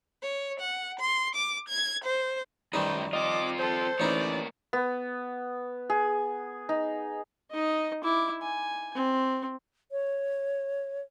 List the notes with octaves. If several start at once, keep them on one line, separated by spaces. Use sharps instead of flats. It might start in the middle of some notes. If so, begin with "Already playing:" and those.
C#5
F#5
C6
D6
G#6
C5
F#2 D#3 G3 D#4 B4 C5
C4 F4 D#5 D6
A4 C5
A1 A#3 D#4 E4 C#5 D5
B3
G#4
D#4
D#4 D#5
E4 D6
G#5
C4
C#5